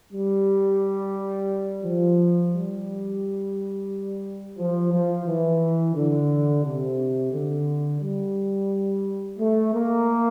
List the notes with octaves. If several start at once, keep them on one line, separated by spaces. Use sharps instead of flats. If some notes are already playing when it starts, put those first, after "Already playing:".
G3
F3
G3
F3
F3
E3
D3
C3
D3
G3
A3
A#3